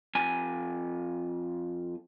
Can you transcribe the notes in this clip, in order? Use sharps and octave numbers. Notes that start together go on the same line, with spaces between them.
F2 G#5